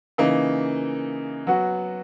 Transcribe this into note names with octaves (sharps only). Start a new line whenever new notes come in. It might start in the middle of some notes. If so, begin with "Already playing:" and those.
C#3 E3 A#3 D#4
F#3 B3 F#4